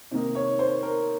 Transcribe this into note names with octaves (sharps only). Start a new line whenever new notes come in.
C3 D#3 A#3 D#4
C#5
C5
A#4